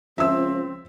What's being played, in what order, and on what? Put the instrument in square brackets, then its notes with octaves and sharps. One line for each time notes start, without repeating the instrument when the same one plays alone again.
[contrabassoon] C#2 [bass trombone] F3 [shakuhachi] C4 [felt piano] E5 E6